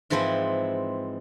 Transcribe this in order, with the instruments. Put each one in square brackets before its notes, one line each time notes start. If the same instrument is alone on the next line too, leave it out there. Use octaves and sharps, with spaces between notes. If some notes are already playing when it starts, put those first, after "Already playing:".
[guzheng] G#2 E3 F3 C4 E4